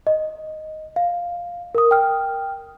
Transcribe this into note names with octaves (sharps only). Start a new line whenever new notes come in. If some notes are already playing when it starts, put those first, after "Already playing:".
D#5
F5
A#4 D#6
G5 F6